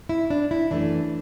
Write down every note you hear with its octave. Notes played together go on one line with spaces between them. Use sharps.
E4
D4
E4
F#2 E3 A3 D4